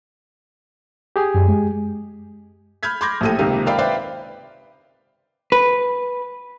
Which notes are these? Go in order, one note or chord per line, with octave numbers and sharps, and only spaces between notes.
G4 G#4 G#5
F#2
G#3
B5 F6 G6 G#6 B6
B5 C6 D6 G6 G#6 A#6
A#1 A2 G4 A4 D#7
C#2 C3 D#3 A#3 G4
A#4 D5 F5 G5 B5
B4 C5 D5 E5 F5 G5
B4